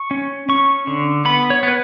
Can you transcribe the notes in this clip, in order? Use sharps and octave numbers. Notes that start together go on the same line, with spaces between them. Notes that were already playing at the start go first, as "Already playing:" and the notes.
Already playing: C#6
C#4
C#4 C#6
D3
B3 B5
C#5
B3
B4